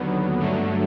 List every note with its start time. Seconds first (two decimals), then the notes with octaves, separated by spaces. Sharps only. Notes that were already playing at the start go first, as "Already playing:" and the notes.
Already playing: D#2 D3 F#3 B3
0.39 G2 D3 F#3 A3